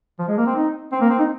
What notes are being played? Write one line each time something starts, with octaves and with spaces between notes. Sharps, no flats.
F3
G#3
A#3
C4
D#4
C4
A#3
C4
D#4